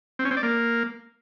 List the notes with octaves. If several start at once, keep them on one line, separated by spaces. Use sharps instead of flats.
C4
C#4
C4
D5
A#3